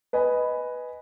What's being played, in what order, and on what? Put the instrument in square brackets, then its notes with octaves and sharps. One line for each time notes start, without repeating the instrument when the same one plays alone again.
[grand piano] B4 D#5 G#5 B5